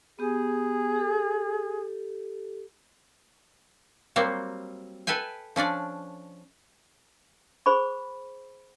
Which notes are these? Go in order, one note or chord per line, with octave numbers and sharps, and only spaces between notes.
B3 G4 G#4
G4 A4
F#3 G3 A#3 C4
A4 B4 E5 G5 G#5
F3 C#4 D4 D5
G#4 C5 B5 C#6